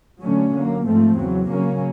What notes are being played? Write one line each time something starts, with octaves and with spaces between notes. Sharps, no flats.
D3 F#3 A3 C#4
D3 F#3 A#3
G#2 F3 A3 C4
E2 C#3 F#3
C#3 F#3 A#3 C#4